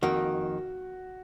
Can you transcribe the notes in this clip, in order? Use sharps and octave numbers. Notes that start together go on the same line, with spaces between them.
F2 D#3 A#3 F#4